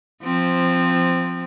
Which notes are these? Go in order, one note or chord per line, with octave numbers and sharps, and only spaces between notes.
F3 C4